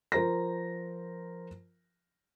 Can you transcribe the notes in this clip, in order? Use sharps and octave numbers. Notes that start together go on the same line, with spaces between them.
F3 A#4 C5 A#5 A#6